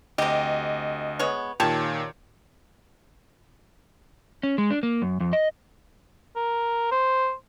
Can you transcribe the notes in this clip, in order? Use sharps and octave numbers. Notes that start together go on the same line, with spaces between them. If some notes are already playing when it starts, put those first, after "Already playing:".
D2 C3 G4 D#5
G#3 B3 C#5
A#2 D#3 G4 C#5 A5
C#4
G#3
D4
A#3
F#2
F2
D#5
A#4
C5